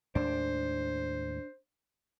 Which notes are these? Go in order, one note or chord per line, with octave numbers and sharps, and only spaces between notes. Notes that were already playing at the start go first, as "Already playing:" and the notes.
D#2 A2 G#3 D4 C5